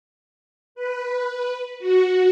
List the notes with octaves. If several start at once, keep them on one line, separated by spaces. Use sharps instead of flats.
B4
F#4